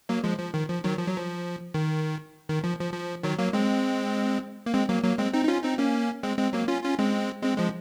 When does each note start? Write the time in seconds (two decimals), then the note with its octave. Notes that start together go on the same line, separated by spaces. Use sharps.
0.09 F#3 A#3
0.24 F3 G#3
0.39 F3
0.54 D#3
0.69 F3
0.84 D#3 F#3
0.98 F3
1.08 F#3
1.16 F3
1.74 D#3
2.49 D#3
2.64 F3
2.79 F3
2.93 F3
3.23 D#3 F#3
3.39 F#3 A#3
3.53 G#3 C4
4.66 A#3
4.74 G#3 C4
4.89 F#3 A#3
5.03 F#3 A#3
5.18 G#3 C4
5.33 C4 D#4
5.45 D#4
5.48 C#4 F4
5.64 C4 D#4
5.78 A#3 C#4
6.23 G#3 C4
6.38 G#3 C4
6.53 F#3 A#3
6.68 C#4 F4
6.84 C#4 F4
6.99 G#3 C4
7.43 G#3 C4
7.58 F3 G#3